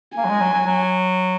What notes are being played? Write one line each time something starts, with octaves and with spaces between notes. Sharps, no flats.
A#3 G#5
F#3
G#3
F#3
F#3
F#3